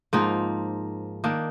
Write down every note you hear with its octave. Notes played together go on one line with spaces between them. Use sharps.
G#2 F3 A#3 D#4
D#3 A#3 D4